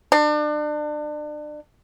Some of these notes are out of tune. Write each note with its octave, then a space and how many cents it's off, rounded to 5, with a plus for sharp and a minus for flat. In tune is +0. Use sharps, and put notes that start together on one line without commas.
D4 +35